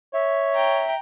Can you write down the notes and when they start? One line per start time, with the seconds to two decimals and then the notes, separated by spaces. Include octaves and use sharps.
0.14 C#5 E5
0.55 G5 A#5